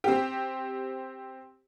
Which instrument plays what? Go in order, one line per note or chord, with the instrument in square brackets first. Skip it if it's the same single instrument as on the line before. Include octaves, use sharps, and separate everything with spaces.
[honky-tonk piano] C4 G4